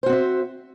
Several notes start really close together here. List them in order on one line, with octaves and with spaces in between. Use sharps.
C5 F#4 C4 E5